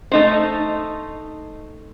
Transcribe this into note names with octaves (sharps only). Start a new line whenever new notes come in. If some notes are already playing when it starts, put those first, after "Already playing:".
A3 D#4 C5